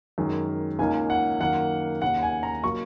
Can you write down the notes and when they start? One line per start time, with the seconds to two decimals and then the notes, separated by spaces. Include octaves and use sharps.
0.18 F#2 D#3 G#3
0.79 C#2 C#3 A#3 D#4 G#5
1.10 F#5
1.40 F#2 D#3 A#3 D#4 F#5
2.02 D#2 C#3 A#3 D#4 F#5
2.23 G#5
2.43 A#5
2.63 C#3 F#3 A#3 C#6